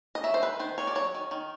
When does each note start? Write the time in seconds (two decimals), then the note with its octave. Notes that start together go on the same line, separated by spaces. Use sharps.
0.15 D#5
0.24 F#3 E5
0.34 C5
0.42 D#3 B4
0.59 D#3 C5
0.78 D#3 C#5
0.87 D5
0.95 F#3 C#5
1.14 D#3
1.31 D#3